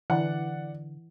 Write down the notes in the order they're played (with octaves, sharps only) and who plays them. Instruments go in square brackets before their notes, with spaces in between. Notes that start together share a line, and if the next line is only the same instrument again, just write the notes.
[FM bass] D3 [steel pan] E3 [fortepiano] D5 F#5